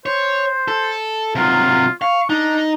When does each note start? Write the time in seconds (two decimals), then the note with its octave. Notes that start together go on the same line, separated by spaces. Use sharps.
0.06 C5 C#5
0.68 A4
1.35 C3 F#3 F4
2.02 F5 C#6
2.30 D4 D#4